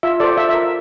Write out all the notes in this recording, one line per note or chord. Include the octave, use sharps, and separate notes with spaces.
F4 E5
A4 C5 D5
F4 E5
E5
A#4